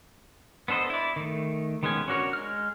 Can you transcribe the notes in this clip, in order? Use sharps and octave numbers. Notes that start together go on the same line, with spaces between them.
B3 D4 A4 C5 D#5
E4 D5
D#3 A3
D#3 G#3 B3 C#4 G#5
C#4 D4 F#4 A#4 C#5
G#3 F6